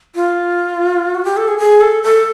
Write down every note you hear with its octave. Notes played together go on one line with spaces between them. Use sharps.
F4
F#4
G4
A4
G#4
G#4
A4
A4